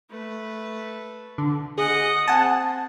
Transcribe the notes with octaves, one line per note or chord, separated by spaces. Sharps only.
A3 B4
D3
G#4 D#5 F#5
C4 F#5 G#5 A5